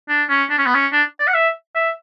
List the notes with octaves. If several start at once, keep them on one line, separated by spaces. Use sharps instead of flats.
D4
C#4
D4
C#4
B3
C#4
D4
D5
F#5
E5
E5